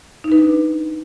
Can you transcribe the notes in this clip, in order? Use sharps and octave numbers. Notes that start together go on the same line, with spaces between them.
D#4
B4
D4